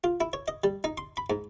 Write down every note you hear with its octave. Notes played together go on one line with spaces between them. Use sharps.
F4
E4
C#5
D#5
G3
D#4
C6
B5
G#2